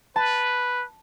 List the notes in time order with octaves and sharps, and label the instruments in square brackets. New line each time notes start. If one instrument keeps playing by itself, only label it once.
[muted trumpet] B4 [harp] A5